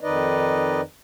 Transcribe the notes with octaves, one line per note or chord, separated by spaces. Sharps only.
F2 D#3 D#4 B4 D5 D#5